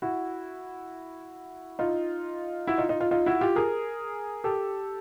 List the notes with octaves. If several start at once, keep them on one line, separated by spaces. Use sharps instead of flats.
E4 F#4
D#4 F4
E4 F#4
D#4 F4
D#4 F4
D#4 F4
D#4 F4
E4 F#4
F4 G4
G#4 A#4
G4 A4